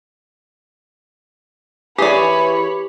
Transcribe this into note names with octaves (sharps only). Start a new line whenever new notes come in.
E3 G4 G#4 C#5 D5 B5